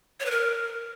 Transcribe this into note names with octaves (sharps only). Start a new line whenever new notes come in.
C#5
B4
A#4